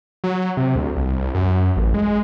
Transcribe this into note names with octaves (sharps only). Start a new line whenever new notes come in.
F#3
C3
D2
C2
F#2
A1
G#3